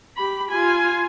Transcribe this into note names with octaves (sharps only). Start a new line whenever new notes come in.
G4 B5
F4 G#5